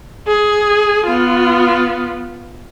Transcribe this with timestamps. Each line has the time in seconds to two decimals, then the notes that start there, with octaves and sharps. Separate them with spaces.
0.28 G#4
1.06 B3 F4